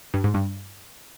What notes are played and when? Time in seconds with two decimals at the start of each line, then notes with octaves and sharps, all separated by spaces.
0.14 G2
0.24 G#2
0.34 G2